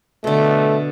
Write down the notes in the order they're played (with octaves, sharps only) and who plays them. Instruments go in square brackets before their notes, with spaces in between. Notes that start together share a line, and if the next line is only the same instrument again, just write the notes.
[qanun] B2 D3 [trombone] A3